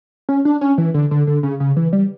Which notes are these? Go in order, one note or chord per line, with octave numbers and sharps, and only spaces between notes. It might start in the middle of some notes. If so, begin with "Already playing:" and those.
C#4
D4
C#4
E3
D3
D3
D3
C#3
C#3
E3
G3